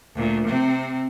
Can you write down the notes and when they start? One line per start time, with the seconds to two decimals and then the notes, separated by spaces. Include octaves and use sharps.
0.15 D2 A#2
0.46 C3 C4